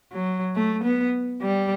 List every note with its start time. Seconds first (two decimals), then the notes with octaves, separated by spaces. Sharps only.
0.12 F#3
0.56 A3
0.84 B3
1.42 G3